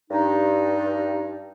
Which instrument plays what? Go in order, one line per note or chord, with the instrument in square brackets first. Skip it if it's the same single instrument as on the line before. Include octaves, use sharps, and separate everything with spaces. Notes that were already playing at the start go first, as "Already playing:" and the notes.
[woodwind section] G2 D#4